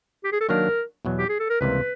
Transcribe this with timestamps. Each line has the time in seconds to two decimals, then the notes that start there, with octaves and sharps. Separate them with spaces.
0.24 G4
0.32 G#4
0.40 A4
0.49 D#3 F#3 A#3 D4 A#4
1.05 E2 B2 F#3
1.19 G4
1.29 G#4
1.40 A4
1.50 A#4
1.60 C#2 C3 E3 G3 A#3 B4